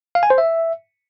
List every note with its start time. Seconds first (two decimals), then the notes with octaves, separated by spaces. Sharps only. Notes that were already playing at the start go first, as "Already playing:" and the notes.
0.15 F5
0.23 G#5
0.30 C5
0.38 E5